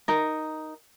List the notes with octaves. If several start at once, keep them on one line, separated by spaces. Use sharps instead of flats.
D#4 A#4